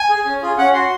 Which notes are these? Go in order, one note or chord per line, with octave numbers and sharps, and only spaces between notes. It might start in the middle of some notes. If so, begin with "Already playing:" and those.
Already playing: G#5
G#4
C#4
F4 G#4
C#4 F#5
F#4 C6